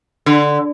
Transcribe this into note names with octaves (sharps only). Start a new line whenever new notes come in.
D3